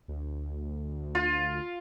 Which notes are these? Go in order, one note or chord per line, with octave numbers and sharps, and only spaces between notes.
D2
F4